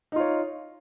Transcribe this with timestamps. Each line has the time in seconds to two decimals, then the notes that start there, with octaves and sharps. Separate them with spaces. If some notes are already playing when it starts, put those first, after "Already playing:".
0.12 D#4
0.16 F4
0.20 C#5